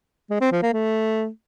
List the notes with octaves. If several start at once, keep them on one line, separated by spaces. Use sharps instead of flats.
G#3
C4
F3
A#3
A3